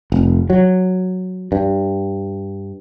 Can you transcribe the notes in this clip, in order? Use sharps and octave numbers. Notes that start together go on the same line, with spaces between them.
F1
F#3
G2